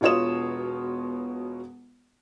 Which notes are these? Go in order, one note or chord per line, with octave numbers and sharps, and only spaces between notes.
E1 B2 F4 C#5 D#6 E7